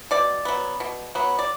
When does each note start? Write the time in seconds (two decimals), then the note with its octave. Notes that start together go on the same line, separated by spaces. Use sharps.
0.11 B2 D5
0.45 F#3 B3
0.80 B2
1.15 F#3 B3
1.39 D5